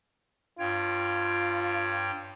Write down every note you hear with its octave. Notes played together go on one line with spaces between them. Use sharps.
G2 F4 C#5 G5